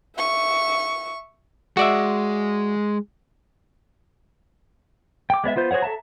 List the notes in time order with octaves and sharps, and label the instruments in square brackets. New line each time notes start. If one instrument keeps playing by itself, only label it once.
[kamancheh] E5 C#6
[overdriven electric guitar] G#3 [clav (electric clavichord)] F#4 D5 E5
[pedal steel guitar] G5 D6
G#3 B3 C#5 E5
B3 F4 C5 G6
F#4 G#4 C5 C#5 F#5
A4 E5 A5 A#5